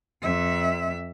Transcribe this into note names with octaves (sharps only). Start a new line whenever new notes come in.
F2 E5